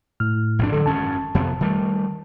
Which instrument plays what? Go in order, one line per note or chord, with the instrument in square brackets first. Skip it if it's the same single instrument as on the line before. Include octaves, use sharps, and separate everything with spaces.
[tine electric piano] A2 F6
[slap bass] A#1 F2 D4
[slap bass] D3 F3 F#3 [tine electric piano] A4
[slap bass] G#1 F#2 C#4 [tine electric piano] A5
[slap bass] F2 C3 B3
D#3 G3 A3